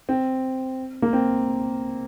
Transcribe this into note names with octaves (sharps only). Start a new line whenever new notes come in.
C4
A#3
C4